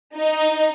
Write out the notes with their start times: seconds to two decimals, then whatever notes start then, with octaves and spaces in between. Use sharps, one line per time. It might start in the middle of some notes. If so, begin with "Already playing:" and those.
0.14 D#4